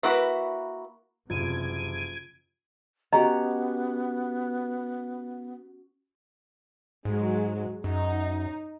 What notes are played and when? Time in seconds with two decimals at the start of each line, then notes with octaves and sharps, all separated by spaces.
0.03 A#3 E4 F#4 B4
1.30 F#1 E2 C3 F3 F4 G#6 D7 D#7
3.13 B3 C#4 F#4 G4 D#5 A#5
7.05 G#2 F#3 G#3
7.84 F#2 D#4